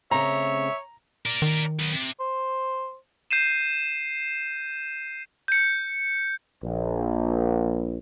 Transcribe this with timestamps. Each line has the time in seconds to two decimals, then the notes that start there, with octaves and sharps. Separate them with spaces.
0.11 C#3 A3 C4 C#5 E5 A#5
1.26 A#4 D5
1.42 D#3
1.79 F#3 B3
1.93 C3
2.20 C5
3.31 G6 C7 D#7 E7
5.48 G6 C#7
6.62 A#1